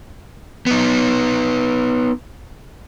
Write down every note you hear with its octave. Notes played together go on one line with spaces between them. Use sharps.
B3 D#4